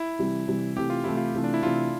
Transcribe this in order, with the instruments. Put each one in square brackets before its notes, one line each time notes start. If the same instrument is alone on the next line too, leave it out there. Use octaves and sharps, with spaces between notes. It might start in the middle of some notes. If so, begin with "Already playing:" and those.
Already playing: [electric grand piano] E4
[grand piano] C3 E3 G3
C3 E3 G3
[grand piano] C3 E3 A3 [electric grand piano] G4
[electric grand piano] F4
[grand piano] C3 E3 A3 [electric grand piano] E4
[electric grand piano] F4
[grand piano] C3 E3 A3
[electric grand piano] D4
E4
[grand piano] C3 E3 A3 [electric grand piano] F4